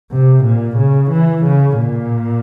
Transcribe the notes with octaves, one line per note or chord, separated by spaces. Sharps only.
C3
A#2
C#3
E3
C#3
A#2